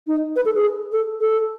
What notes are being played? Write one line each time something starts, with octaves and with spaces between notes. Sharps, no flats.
D#4
B4
A4
G#4
A4
A4